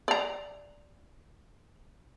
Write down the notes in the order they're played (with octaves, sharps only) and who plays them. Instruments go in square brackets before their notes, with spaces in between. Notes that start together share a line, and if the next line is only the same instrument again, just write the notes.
[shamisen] D5 A#5